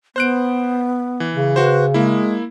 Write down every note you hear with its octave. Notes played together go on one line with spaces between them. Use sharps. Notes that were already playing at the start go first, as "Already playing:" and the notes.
B3 C5 F#6 D7
E3
C#3
F#4 B4 C5
G#3 A#3 E4